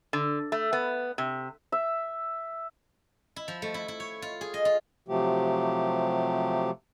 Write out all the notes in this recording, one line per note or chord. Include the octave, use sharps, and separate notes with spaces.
D3
A3
B3
C3
E5
E4
F3
A3
E4
E4
C#5
F4
G#4
D#5
F4
C3 F3 F#3 A3 G4